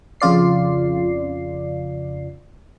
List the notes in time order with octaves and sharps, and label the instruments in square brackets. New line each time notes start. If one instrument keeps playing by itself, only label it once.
[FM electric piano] F2 C#3 F4 D5 C7